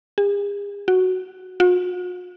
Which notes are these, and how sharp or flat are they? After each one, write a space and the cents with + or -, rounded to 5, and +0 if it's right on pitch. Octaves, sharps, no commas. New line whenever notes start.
G#4 -45
F#4 +0
F#4 -45